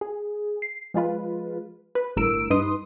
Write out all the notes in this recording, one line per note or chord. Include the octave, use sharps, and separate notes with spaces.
G#4
C7
F3 G#3 F4 B4
B4
G1 A2 A#4 E6 D7
G2 D#4 B4 C6 D#6